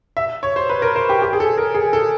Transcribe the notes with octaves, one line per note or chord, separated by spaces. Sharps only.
E5
C#5
C5
B4
A#4
C5
G4
G4
G#4
A4
A#4
G#4
A4